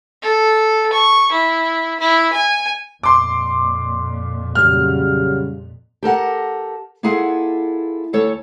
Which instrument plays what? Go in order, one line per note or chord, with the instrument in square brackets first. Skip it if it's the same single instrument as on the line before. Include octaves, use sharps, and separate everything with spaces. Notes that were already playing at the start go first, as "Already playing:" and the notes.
[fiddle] A4
C#6
E4
E4
G#5
[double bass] F2 A#2 [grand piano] C6 D6
[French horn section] C#3 F#3 G3 [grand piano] F6
[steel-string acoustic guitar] G4 A4 A#4 F#5
A#3 E4 F4 G#4 A4 F#5
D2 A4 C#5